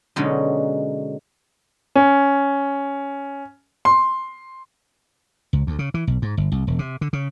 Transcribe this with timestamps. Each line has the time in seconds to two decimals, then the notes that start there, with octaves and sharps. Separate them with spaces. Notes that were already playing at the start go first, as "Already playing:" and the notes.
0.16 B2 D3 F#3 G#3 C#4 D#4
1.96 C#4
3.85 C6
5.53 C#2
5.67 D2
5.79 C#3
5.94 E3
6.07 B1
6.22 G#2
6.37 G1
6.52 C2
6.67 E1
6.79 C3
7.01 D3
7.13 C#3